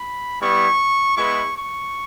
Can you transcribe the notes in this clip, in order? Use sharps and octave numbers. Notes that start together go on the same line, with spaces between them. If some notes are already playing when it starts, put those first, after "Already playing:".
Already playing: B5
G3 B3 E4 C#6
G#3 B3 E4 C#6
C#6